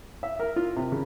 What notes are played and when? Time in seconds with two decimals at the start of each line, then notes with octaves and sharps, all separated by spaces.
0.23 E5
0.40 A#4
0.56 F4
0.76 C3
0.92 C#3